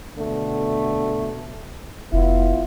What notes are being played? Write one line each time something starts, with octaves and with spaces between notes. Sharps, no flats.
B2 D3 A3
F1 B3 E4 F4